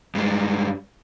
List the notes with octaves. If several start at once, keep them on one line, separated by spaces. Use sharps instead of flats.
G2 G#3